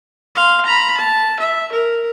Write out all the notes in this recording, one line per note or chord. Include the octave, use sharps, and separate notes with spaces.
F5 C6
A#5 B5
A5
E5
A#4